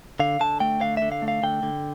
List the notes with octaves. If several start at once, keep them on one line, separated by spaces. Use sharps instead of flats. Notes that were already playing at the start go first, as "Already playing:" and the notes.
D3 F5
D3 A5
A3 G5
D3 F5
D3 E5
F5
A3
F5
D3 G5
D3